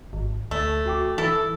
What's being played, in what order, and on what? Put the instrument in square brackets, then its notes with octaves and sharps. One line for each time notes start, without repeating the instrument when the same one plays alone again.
[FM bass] G#1
[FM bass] D2 [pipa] A3
[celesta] F#4 G5 D6
[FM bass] E3 [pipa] E4 A4 [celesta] E6